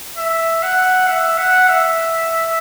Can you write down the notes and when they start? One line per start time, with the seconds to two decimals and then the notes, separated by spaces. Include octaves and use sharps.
0.18 E5
0.63 F#5
1.08 E5
1.38 F#5
1.69 E5